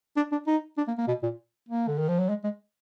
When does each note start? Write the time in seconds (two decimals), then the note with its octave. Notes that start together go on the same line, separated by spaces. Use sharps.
0.17 D4
0.32 D4
0.47 D#4
0.78 D4
0.88 A#3
0.98 A#3
1.08 B2
1.23 A#2
1.69 A#3
1.88 D3
1.98 D#3
2.08 F3
2.19 F#3
2.29 G#3
2.44 G#3